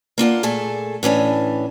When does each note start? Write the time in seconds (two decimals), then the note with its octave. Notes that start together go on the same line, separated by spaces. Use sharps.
0.18 A#3 D4 F4 F#5
0.43 A#2 A3 G#4 A4
1.03 A2 E3 C#4 D4